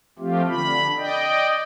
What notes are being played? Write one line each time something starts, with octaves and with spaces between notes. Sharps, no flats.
F3 A3 C4 F4 G4
D3 B5
D5 D#5 G5